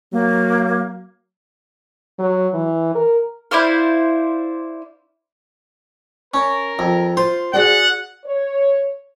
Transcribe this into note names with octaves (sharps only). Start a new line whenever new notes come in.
F#3 A#3
F#3
E3
A#4
E4 C5 D5 F5
C#4 A#4
F2
F4 C5
F#4 G#4 D5 F#5
C#5